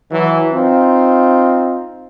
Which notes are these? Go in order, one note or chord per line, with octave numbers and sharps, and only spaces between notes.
E3 F#3
C4 D#4 F4